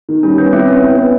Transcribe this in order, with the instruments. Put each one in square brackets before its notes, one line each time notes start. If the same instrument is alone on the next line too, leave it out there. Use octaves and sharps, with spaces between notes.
[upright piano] D#3
[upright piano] G3 [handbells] C#4
[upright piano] B3 [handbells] C#4
[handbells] C4 [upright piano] E4
[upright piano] B3 [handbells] C#4
[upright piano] E4
B3